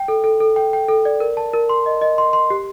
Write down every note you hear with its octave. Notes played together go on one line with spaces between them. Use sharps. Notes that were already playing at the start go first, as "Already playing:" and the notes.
Already playing: G5
A4
A4
A4
G5
G5
A4
D5
A#4
A5
A#4
C6
D#5
D#5
C6
C6
G4